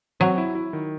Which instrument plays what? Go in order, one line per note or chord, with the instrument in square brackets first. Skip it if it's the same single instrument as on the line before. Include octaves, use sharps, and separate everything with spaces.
[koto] F#3 [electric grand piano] C4
[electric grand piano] E4
E4
D#3